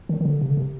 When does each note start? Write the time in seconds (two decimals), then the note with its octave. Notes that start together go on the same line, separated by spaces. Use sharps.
0.09 D#3
0.21 D#3
0.25 D3
0.41 C3
0.50 D3
0.57 C3